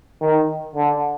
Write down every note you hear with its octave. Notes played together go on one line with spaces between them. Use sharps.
D#3
D3